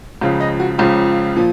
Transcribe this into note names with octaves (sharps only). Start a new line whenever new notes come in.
C#2 C#3 F3 F5
D#5
F#4
C#2 C#3 F3 F4
A#2 F3